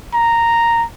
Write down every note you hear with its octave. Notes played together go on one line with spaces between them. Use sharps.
A#5